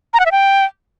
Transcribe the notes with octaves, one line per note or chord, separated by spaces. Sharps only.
A#5
F#5
E5
G5